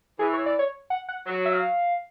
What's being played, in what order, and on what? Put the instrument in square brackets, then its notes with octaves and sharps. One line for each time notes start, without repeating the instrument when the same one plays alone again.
[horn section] E3 [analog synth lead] G#4
[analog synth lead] C#5
D5
C#5
F#5
F#5
[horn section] F#3
[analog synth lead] E5
F5